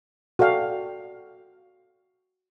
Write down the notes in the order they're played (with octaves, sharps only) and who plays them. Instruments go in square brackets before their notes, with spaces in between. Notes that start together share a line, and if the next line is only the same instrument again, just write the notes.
[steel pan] F#4 A4 D5 F5 G5